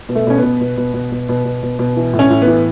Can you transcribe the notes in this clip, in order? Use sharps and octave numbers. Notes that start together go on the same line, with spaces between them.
B2
A3
B2 C#4
B2 B3
B2
B2
B2
B2
B2
B2
B2
B2
E3
A2
C#4
A2
B3
E3